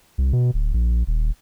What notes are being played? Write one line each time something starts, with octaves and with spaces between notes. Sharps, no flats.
C2
B2
D1
A#1
D#1